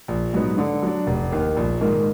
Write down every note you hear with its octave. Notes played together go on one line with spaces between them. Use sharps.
A#1
G#2 F#3 B3 D#4
D3
F#3 D4
F1
D#2 D#3
A#1
G#2 D#3 A#3